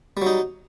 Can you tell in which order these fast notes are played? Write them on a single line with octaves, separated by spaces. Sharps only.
G3 F#3 D#4